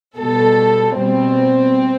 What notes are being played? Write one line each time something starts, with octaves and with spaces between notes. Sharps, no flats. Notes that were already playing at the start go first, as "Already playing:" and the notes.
B2 G3 A4
B2 G3 C4